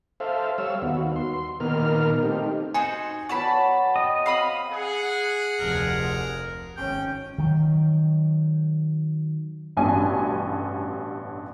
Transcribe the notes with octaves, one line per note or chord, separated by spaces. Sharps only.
A4 C5 E5 F5
G3 C#5 F5 E6
D#2 B3 F#4
C6
A#2 D#3 B3 A#4 F6
A3 C4 D#4 G4
D#4 F#4 C5 G#5
F#3 B3 F#4 D5 A5 B5 C#6
D#5 F#5 G5
C4 F5 B5 D#6
G#4 F#5
F1 D2 A#4
G#1 C#4 G5
D#3 F#3
A1 G2 B2 C#4 G#5 A5